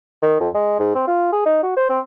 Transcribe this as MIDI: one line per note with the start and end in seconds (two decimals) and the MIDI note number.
0.22 0.35 51
0.40 0.49 41
0.54 0.74 56
0.79 0.94 44
0.95 1.05 60
1.07 1.29 65
1.32 1.43 68
1.45 1.58 63
1.63 1.73 66
1.77 1.85 72
1.89 1.99 60